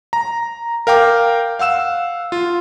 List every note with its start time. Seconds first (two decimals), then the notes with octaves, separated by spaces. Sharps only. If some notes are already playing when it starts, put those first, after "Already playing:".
0.13 A#5
0.87 A#4 F5 G5 D6
1.59 F5 F#5 E6 E7
2.32 F4